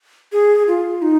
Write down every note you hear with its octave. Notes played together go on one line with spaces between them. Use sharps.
G#4
F4
D#4